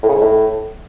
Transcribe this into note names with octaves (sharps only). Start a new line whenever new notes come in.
A2
C#3
G#2
A2